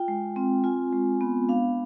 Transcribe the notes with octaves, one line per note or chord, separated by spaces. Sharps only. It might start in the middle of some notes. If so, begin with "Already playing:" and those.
Already playing: F4 G5
G#3
C4
F4 G#5
G#3
B3
D4 F5